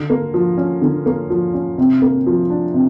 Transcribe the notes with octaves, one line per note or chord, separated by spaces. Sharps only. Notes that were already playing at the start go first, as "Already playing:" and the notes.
Already playing: D3
A#3
F3
C#4
D3
A#3
F3
C#4
C3
A#3
F3
D4
C3